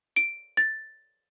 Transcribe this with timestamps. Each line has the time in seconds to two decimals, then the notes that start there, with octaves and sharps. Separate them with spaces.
0.16 D7
0.57 A6